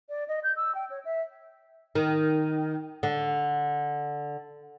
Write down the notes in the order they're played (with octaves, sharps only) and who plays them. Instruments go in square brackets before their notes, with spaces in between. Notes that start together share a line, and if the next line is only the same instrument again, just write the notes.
[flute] D5
D#5
G6
E6
G5
C#5
E5
[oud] D#3
D3